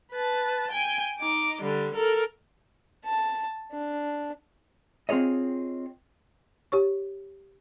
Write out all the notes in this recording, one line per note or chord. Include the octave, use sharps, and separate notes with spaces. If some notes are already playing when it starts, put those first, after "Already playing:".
B4 A5
G5 G#5
D#4 D6
D3 G3
A4 A#4
A5
D4
C4 F4 G#4 C#5 D#5
G4 C#5 C#6